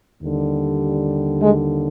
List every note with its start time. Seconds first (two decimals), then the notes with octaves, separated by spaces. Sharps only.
0.21 D#2 D3 G3
1.40 G#3